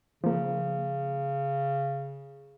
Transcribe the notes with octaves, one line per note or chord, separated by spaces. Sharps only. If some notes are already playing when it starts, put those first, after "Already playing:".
C#3 F3 A#3